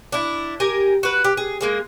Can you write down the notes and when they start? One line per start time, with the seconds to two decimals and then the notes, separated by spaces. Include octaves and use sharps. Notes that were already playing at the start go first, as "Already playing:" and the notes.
0.12 D4 E4
0.60 G4 A#4 G#5
1.03 F#4 B4
1.24 G4
1.37 G#4
1.61 G#3 A#3 G#4